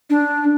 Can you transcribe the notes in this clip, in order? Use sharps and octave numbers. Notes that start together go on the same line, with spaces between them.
D4